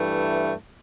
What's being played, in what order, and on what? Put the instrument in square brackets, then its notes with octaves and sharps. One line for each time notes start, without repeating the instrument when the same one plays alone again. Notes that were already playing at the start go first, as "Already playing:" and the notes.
Already playing: [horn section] G2 E3 A3